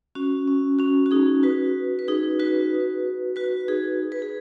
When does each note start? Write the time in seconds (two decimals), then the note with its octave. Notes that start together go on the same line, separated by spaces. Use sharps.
0.15 C#4 F#4
0.48 C#4
0.79 C#4 F#4
1.06 F#4
1.11 D#4 G#4
1.43 F#4 B4
1.99 B4
2.08 D#4 G#4
2.39 F#4 B4
3.36 F#4 B4
3.68 D#4 G#4
4.12 B4
4.22 G#4